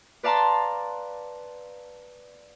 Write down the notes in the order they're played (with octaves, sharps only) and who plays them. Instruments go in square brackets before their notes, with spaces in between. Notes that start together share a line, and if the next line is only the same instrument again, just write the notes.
[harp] B4 D5 F5 A5 A#5 C6